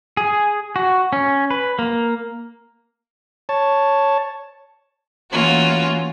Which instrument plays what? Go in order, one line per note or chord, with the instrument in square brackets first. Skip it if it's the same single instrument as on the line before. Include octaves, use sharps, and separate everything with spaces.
[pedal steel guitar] G#4
F#4
C#4
B4
A#3
[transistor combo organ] C#5 A5
[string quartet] E3 A3 A#3 C#4 F4 F#4